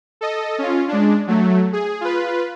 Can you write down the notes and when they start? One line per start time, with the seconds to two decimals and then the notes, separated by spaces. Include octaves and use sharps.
0.21 A4 D#5
0.58 C#4 F4
0.88 G#3 D4
1.27 F#3 A3
1.73 G#4
2.01 F4 B4